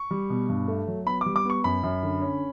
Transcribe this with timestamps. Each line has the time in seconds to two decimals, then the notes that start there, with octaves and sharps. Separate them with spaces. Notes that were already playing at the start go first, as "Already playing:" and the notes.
Already playing: C#6
0.11 G3
0.30 B2
0.49 G2
0.68 A3
0.88 F#3
1.07 B3 B5
1.21 G3 D6
1.36 D6
1.45 B3 C#6
1.64 F#2 B5
1.83 F#2
2.03 D3
2.22 C#4